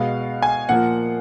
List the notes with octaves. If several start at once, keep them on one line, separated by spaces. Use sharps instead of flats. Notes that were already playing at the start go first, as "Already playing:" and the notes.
Already playing: B2 G#3 B3 F5
G#5
A#2 F3 A#3 F#5